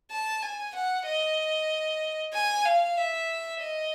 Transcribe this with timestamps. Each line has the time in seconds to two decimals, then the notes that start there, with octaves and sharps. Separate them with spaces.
0.11 A5
0.42 G#5
0.75 F#5
1.06 D#5
2.33 G#5
2.65 F5
2.97 E5
3.61 D#5